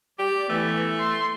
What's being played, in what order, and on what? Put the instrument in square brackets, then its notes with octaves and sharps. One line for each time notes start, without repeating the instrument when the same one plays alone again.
[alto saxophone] G4 [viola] D5
[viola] E3 B3 [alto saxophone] A3
[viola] C6